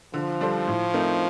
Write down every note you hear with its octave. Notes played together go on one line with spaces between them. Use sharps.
D3 F3
G3 D4 A4 C5
A2
A3 C4 D#4 A#4